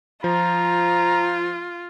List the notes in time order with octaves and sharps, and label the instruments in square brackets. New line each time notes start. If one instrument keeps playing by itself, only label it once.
[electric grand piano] F3 [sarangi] F4 [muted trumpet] A#5